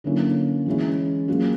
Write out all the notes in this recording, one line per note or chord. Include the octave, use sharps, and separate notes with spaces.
D3 F#3 A#3 C#4 E4
E3 G#3 C#4 E4
F#3 A#3 C#4 F4 G#4